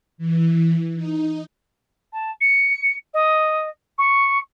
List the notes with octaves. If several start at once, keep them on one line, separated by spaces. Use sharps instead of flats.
E3
D#4
A5
C#7
D#5
C#6